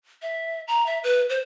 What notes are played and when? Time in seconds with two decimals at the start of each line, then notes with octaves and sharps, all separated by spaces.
0.22 E5
0.68 A#5
0.86 E5
1.04 B4
1.29 C5